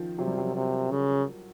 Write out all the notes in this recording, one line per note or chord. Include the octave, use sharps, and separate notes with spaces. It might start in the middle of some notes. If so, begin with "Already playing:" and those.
Already playing: D#3 F3
C3 F#3
G3
F#3
C3
C#3